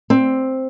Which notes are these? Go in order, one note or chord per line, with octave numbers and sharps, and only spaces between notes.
C4